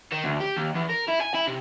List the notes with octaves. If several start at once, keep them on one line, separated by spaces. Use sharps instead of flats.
D#3
D2
G4
D#2
E2
A#4
E4
G#5
E4
C3